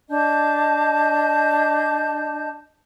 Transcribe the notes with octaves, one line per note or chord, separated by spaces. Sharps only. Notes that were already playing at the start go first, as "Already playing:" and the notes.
D4 D#5 A5 G6